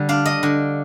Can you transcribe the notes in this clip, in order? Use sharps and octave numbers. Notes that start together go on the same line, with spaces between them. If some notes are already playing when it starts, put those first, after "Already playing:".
Already playing: D3 G3
D4 F5
D#5
D3